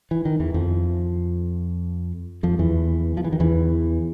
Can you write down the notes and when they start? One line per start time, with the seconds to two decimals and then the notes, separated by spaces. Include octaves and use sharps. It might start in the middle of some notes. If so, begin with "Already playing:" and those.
0.11 E3
0.25 D#3
0.40 E2 E3
0.54 F2 F3
2.43 F2 F3
2.59 E2 E3
3.17 F3
3.24 E3
3.32 D#3
3.40 E2 E3